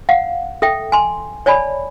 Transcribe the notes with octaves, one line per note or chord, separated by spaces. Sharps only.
F5 F#5
A4 E5 G5
G#5 C6
C#5 D5 G#5 A5 B5